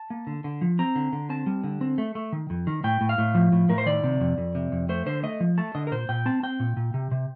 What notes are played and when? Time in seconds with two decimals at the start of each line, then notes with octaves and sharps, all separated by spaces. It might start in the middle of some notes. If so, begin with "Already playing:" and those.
Already playing: A5
0.10 A#3
0.27 D3
0.44 D3
0.61 F3
0.79 C4 A#5
0.96 D3
1.13 D3
1.29 C4 A5
1.46 G3
1.64 D3
1.81 C4
1.98 A3
2.15 A3
2.32 D#3
2.50 F2
2.67 D#3
2.84 A2 G5
3.01 A2
3.09 F5
3.18 A2
3.35 F3
3.52 A2
3.69 A2 A#4
3.78 C5
3.86 D#3 D5
4.04 C3
4.21 F2
4.38 F2
4.55 C3
4.72 F2
4.89 A3 C5
5.06 D3 C5
5.23 A3 D#5
5.40 F3
5.58 A3 A5
5.75 D3 D#5
5.87 A#4
5.91 A#2 C5
6.09 A#2 G5
6.26 C4 A5
6.43 C4 G5
6.60 A#2
6.77 A#2
6.94 C3
7.11 C3